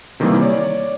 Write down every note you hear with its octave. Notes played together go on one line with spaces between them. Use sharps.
C3 D#3 E3 G3 A#3
C#5 D5